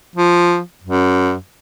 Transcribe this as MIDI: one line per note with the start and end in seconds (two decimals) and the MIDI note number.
0.16 0.60 53
0.83 1.35 42